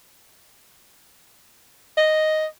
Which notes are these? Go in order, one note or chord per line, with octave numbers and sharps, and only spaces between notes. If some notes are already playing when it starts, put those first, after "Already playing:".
D#5